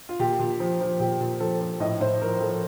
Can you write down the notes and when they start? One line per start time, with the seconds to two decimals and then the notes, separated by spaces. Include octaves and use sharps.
0.09 F4
0.19 A#2 G4
0.39 A#2
0.60 F3
0.80 F3
1.00 A#2 G4
1.21 A#2
1.40 F3 A4
1.61 F3
1.80 A2 D#5
2.00 A2 C5
2.21 F3 A#4
2.41 F3 A4